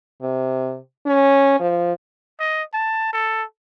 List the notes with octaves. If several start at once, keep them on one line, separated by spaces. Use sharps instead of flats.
C3
C#4
F3
D#5
A5
A4